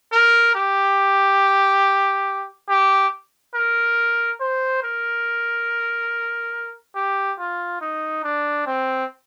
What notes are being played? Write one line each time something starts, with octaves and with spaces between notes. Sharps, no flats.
A#4
G4
G4
A#4
C5
A#4
G4
F4
D#4
D4
C4